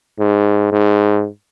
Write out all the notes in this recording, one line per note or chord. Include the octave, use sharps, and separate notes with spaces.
G#2
G#2